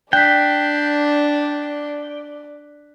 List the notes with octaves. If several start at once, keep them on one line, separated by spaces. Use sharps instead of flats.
D4 D5 G5 F#6 B6